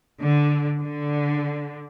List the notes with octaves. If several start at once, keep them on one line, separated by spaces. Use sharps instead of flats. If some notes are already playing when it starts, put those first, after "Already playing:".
D3
D3